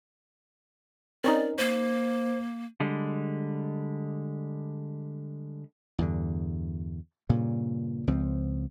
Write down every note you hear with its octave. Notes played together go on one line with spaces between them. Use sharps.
C4 C#4 D#4 A#4 D5
A#3 C5
D3 G3 G#3
E2 G2 D3
G2 A#2 C#3
C#2 F3 C4